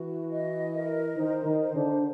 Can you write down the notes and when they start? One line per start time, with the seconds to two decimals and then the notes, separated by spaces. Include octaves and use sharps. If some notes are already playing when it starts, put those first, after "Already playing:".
Already playing: E3 E4 F#4
0.32 D#5
0.74 A#4
1.16 D#3 D#4 C5
1.45 D#3 D#4
1.59 C5
1.74 D3 D4